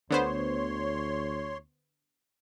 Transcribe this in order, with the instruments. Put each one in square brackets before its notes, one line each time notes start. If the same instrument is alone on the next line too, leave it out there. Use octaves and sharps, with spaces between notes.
[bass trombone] D2 [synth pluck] D3 B3 C5 [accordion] C#5 C6